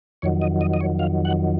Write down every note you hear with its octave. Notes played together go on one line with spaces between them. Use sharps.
F2 D#3 F#3 C#5
D#5
D#5
D#5
C#5
F5
F#5